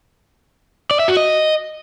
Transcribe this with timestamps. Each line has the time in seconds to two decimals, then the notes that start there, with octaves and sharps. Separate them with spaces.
0.91 D5
0.99 E5
1.08 F#4
1.17 D#5